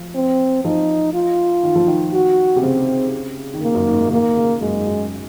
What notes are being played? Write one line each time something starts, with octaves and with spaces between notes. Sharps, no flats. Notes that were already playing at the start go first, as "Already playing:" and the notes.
Already playing: F3
C4
F3 D#4
F4
D#3
F3
D#3
F#4
C3
C#3 C4
D#3
C#3 A#3
F#2
G#2
A#2
C#3
D#3 A#3
C#3
F#2 G#3
G#2
F#2